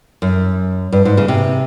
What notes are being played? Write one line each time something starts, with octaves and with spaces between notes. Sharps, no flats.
F#2
G2
G#2
C#3
C3